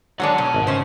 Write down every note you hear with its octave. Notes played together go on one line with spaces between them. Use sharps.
D3 F#3 G#3 D4 C#5 F#5 A5
B2
G#1
C#3 C#4 C5